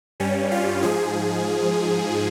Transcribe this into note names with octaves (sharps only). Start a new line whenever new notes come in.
G2 G3 C#4
F4
G#2 F3 G#4